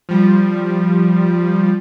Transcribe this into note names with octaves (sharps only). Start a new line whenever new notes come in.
F3 G3